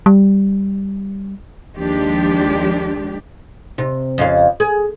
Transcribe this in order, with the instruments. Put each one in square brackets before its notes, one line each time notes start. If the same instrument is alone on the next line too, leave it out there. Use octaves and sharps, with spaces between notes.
[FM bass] G3
[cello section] D#2 F3 G#3 D4 G4
[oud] C3
F2 C#3 F5
G#4